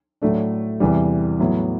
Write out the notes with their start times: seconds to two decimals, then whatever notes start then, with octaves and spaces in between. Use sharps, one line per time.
0.22 A2 F#3 A3 D4
0.80 E2 C3 E3 G3
1.40 A2 F#3 B3 E4